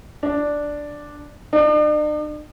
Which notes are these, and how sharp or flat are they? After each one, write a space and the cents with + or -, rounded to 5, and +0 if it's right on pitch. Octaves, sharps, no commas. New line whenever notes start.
D4 +0
D4 +45